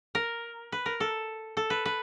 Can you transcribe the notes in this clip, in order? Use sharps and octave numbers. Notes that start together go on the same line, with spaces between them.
A#4
B4
A#4
A4
A4
B4
B4